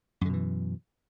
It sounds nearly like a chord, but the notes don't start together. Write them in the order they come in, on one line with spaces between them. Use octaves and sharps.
F#2 D3 B2 E3